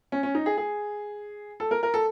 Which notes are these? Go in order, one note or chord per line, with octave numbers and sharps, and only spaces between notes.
C#4
C#4
D#4
G#4
G#4
A4
A#4
A#4
A4